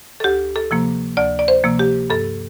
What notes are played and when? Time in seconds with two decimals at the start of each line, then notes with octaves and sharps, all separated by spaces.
0.20 A4
0.24 D2 G4
0.56 A4
0.71 C3 F3 A#3
1.17 D2 D5
1.39 D5
1.48 C5
1.64 C3 F3 A#3
1.79 G4
2.10 G2 A4